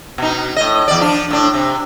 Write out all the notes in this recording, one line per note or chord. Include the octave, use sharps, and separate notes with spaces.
B2 D#4
A2 D#5
E2 D5
F3 D4
A2 D4
C3